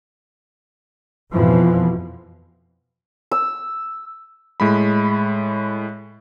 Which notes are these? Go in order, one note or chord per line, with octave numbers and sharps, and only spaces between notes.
F2 B2 E3 F3
E6
A2 G#3 B5